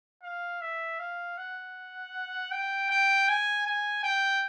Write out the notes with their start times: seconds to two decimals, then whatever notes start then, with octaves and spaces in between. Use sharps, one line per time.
0.23 F5
0.61 E5
0.99 F5
1.38 F#5
2.51 G5
2.90 G5
3.28 G#5
3.66 G#5
4.04 G5